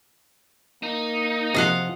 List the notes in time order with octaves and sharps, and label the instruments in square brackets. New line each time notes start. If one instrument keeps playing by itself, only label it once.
[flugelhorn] A#3 [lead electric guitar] D#4
[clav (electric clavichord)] C3 F3 [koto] D#5 F5 F#5